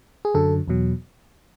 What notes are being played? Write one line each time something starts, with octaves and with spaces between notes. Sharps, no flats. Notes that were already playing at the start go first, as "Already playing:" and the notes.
G#4
F#2 D3 F#3 A4
E2 B2 F#3